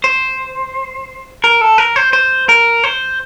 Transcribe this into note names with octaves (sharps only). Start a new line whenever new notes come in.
C5
A#4
A4
A#4
C5
C5
A#4
C5